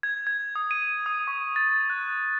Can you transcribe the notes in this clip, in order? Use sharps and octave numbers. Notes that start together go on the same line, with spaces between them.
G#6
G#6
D#6
D#7
D#6
C#6
A6
F#6